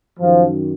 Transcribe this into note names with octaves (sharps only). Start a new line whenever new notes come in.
F#2 D#3 F3